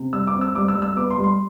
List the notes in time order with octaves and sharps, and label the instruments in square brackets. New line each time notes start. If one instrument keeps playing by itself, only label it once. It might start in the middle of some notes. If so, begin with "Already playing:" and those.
Already playing: [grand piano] C3
G3 E6
D6
C4
E6
G3 D6
E6
G3
E6
B3 D6
C6
G3
C6